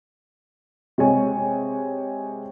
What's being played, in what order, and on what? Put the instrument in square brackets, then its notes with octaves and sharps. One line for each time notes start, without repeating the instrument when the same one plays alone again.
[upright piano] C3 G#3 C#5 G#5